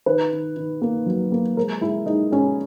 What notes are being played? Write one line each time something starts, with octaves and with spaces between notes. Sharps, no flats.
D#3 B4
D#3
D#3
A#3
F#3
A#3
G#3 A#4
G#3 E4
G#3 D#4
G#3 C#4